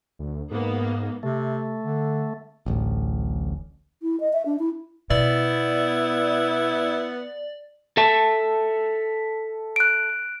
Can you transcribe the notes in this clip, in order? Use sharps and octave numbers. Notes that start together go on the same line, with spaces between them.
D2
G#2 A#3 B3
C3 A3
D3
D1 A1
E4
D#5
E5
D4
E4
B2 B3 E4 D5
A4 E5 A5
F#6 D7